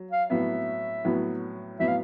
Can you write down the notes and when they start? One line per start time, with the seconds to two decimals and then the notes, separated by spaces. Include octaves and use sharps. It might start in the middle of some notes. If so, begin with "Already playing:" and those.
Already playing: F#3
0.11 F5
0.30 A2 F#3 B3 E5
1.04 A2 F#3 B3
1.80 A2 F#3 B3 E5
1.88 F5